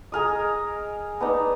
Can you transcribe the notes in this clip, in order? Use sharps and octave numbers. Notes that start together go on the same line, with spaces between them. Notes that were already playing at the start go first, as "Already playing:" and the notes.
G#4 A#4 D#5
B3 D4 D#4